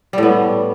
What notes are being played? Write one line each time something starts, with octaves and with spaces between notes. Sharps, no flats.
A2 G3 B3